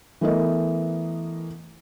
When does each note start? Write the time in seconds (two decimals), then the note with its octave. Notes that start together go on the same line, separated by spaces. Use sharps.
0.21 E3 A3 B3 A4 A#4 D#5